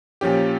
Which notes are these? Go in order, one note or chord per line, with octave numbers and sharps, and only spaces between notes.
A#2 F3 C#4 G4